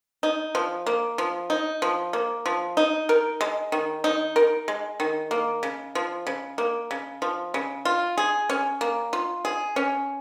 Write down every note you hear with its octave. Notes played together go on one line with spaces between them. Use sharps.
D#4
F3
A#3
F3
D#4
F3
A#3
F3
D#4
A#4
G#3
D#3
D#4
A#4
G#3
D#3
A#3
C#3
F3
C#3
A#3
C#3
F3
C#3
F4
G#4
C#4
A#3
F4
G#4
C#4